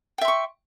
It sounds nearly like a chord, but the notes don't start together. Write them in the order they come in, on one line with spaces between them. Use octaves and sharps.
G5 E5 C6 C#6